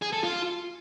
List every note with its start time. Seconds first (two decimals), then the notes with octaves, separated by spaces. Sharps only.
0.02 G#4
0.13 A4
0.24 F4